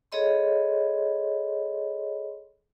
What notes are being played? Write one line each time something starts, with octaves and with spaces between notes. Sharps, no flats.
G#4 A4 C#5 D#5 B5 C6